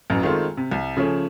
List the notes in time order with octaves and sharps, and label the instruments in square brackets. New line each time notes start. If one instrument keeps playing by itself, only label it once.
[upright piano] A1 F#2
D#3 G#3 A3 C4 F4
C3
C2
C#3 F3 A3 C#4